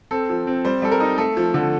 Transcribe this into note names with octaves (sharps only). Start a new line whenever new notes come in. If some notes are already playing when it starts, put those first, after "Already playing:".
C4 A4
F3
C4
G3 C5
G3 A4
A#4
D#4
A3 A4
F3
D3